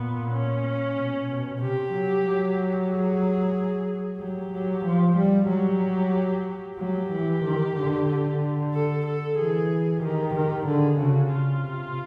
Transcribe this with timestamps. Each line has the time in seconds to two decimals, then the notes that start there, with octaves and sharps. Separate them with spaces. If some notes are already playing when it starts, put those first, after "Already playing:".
Already playing: A#2 B3
0.32 C#4
0.97 B2
1.29 B2
1.61 C3 G4
1.94 F#3
2.26 F#3
2.90 G#4
4.20 F#3 G4
4.52 F#3
4.85 F3
5.17 G3
5.49 F#3 G4
6.79 F#3 G4
7.11 E3
7.44 D#3
7.77 D3
8.08 D3
8.74 A4
9.06 A4
9.38 E3 G#4
10.02 D#3 G4
10.35 D#3
10.67 D3 G#4
11.00 C#3 F#4
11.32 C#3 F4
11.64 C3